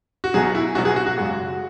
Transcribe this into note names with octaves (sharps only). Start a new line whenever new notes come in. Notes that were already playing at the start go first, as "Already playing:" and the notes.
F#4
B1 B2 F#3 G#4
E4
B1 B2 F#3 F#4
G#4
F#4
F#4
G#1 F#2 C#3 G#3 F#4